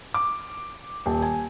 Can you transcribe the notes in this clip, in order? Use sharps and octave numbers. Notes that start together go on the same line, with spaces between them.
D6
D#1
G#5